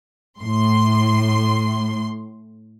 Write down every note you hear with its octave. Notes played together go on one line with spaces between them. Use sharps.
A2 C6